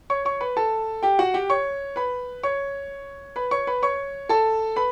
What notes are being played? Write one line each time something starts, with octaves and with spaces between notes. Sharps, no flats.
C#5 C#6
C#5 C#6
B4 B5
A4 A5
G4 G5
F#4 F#5
G4 G5
C#5 C#6
B4 B5
C#5 C#6
B4 B5
C#5 C#6
B4 B5
C#5 C#6
A4 A5
B4 B5